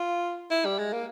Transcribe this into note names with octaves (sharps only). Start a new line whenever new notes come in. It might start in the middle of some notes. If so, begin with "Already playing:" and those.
Already playing: F4
E4
G3
G#3
A#3